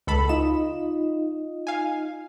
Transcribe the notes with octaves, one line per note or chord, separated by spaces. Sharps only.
C#2 A4 B5
D#4 F4 D#5 E7
F5 G#5